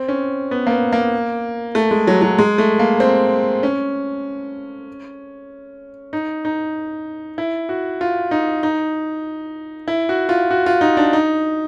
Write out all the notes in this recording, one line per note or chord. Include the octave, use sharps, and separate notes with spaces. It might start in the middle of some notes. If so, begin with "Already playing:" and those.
Already playing: C4
C#4
B3
A#3
B3
A#3
A3
G#3
F#3
F#3
G#3
A3
A#3
C4
C#4
D#4
D#4
E4
F#4
F4
D#4
D#4
E4
F#4
F4
F#4
F4
D#4
D4
D#4